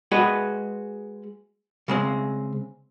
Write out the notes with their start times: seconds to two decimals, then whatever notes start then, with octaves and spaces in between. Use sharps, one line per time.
0.11 G#3 F#4 B4 D#5
1.88 C#3 G#3 C4